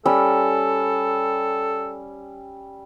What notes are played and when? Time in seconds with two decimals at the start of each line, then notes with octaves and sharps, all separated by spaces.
0.06 G3 C#4 A4 E6